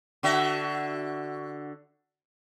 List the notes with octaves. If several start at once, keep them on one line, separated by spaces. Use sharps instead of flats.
D3 F#4 E5